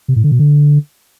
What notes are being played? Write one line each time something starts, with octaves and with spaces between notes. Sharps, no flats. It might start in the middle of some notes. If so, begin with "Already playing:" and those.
C3
A2
D3
B2
D3